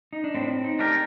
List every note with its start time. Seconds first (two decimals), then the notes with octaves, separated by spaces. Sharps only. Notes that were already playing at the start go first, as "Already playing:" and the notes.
0.13 D#4
0.24 D4
0.35 A2 C4
0.64 D#4
0.79 A3 D4 G4 A#4